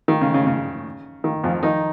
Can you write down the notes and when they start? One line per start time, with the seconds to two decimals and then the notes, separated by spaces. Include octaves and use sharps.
0.08 D#3
0.21 C#3
0.34 C#3
0.47 C#3
1.24 D#3
1.44 F2 F3
1.63 D#3 D#4